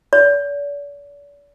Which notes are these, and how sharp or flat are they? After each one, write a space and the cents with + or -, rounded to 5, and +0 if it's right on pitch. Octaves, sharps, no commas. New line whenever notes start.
D5 -45